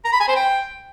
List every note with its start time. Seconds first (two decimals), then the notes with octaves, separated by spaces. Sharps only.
0.05 A#5
0.12 B5
0.20 G#5
0.28 C5
0.36 G5